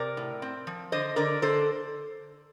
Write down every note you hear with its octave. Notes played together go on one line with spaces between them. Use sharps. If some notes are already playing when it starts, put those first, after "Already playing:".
Already playing: C3 A#4 D5
A2
C4
F3
D3 C5 D#5
D3 A#4 D5
D3 A4 C5